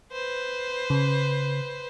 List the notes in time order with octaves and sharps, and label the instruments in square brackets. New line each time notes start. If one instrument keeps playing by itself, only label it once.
[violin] B4 C5
[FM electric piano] C#3